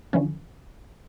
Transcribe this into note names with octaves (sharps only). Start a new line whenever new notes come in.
D3 E3 F3 C#4